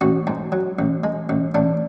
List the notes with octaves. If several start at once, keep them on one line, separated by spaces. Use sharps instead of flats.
A1 F#4
G#2
F#3
A1
G#3
A1
A1 D4